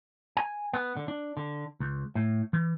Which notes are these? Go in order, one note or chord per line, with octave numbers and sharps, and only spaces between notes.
G#5
B3
D3
D4
D3
C#2
A2
E3